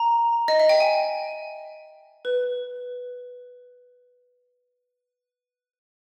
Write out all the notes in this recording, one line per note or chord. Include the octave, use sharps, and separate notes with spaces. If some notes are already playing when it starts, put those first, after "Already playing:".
Already playing: A#5
D#5
E5
G5
G#5
B4